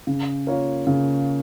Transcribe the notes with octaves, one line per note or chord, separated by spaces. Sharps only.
C#3
A#3 F4 A#4 C#5
C#3